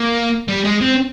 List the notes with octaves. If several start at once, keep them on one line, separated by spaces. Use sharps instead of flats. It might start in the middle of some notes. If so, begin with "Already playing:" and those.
Already playing: A#3
G3
G#3
C4